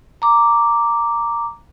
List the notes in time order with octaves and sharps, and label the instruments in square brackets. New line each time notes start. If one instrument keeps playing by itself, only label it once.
[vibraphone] A#5 D6